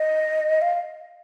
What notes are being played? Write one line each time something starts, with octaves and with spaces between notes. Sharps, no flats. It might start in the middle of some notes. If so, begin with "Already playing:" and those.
Already playing: D#5
F5